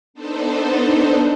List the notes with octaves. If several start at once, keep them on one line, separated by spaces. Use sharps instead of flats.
B3 D4 D#4 A4 C5